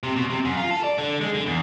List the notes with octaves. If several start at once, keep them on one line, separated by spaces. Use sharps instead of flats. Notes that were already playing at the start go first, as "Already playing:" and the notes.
C3
B2
C3
F#2
F4
A4
D5
D3
G#3
D3
E2